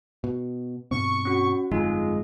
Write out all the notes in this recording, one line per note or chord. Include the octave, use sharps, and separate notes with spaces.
B2
G2 B2 C4 C#6
C#4 F#4
G1 F2 G#3 D#4 F4